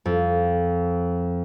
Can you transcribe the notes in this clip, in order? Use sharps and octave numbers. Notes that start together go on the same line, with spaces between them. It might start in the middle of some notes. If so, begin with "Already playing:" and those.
F2